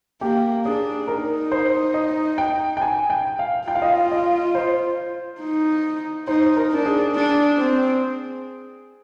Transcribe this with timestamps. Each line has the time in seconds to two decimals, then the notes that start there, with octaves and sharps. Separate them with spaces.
0.21 A#3 G4
0.65 D4 G#4
1.07 D#4 A#4
1.52 C5
1.94 D#5
2.38 G5
2.77 G5
2.82 G#5
3.10 G5
3.39 F5
3.68 F4 G5
3.75 F5
3.82 D#5
3.90 F5
4.12 D#5
4.55 C5
5.41 D#4
6.27 D#4 C5
6.57 A#4
6.72 D4
6.86 G#4
7.15 D4
7.58 C4